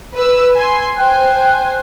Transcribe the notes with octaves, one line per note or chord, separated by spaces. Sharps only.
B4 E6
G#5 C6
C5 G5 G#5 F#6 G6